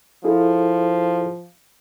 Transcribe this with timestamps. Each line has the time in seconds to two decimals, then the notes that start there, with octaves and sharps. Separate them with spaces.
0.24 F3 E4 G#4 A4